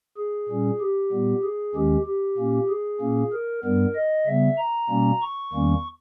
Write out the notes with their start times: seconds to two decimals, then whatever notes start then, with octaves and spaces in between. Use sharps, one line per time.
0.17 G#4
0.49 A#2 G3 C#4
0.80 G4
1.12 A#2 G3 B3
1.44 G#4
1.75 D#2 D#3 G#3 C#4 G4
2.06 G4
2.37 A#2 A#3 C#4
2.69 G#4
3.01 A#2 A#3 C#4
3.32 A#4
3.64 G2 G3 B3 A#4
3.95 D#5
4.27 C#3 G3 B3 E5
4.58 A#5
4.90 B2 G3 A#3 C#4
5.22 C#6
5.53 E2 D#3 G3 A#3 C#4